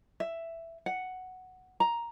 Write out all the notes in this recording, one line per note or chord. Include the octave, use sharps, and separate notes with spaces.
E5
F#5
A#5